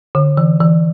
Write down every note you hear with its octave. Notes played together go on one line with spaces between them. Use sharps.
D3
E3
E3